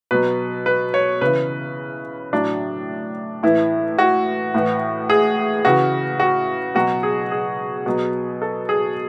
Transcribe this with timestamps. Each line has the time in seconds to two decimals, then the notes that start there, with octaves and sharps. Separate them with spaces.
0.11 B2 F#3 B4
0.66 B4
0.94 C#5
1.21 C#3 E3 B4
2.33 A2 F#3 D4
3.43 A2 E3 E4
3.98 F#4
4.54 A2 E3
5.10 G#4
5.65 C#3 E3 F#4
6.20 F#4
6.75 B2 F#3 F#4
7.03 G#4
7.31 G#4
7.86 B2 F#3
8.42 A4
8.69 G#4